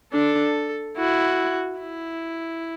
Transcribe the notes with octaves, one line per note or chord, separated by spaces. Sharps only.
D4 A4
E4 F#4
E4